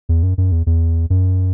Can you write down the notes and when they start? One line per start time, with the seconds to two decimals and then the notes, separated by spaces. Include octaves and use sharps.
0.09 E2
0.23 F#2
0.38 F#2
0.52 E2
0.67 E2
1.10 F#2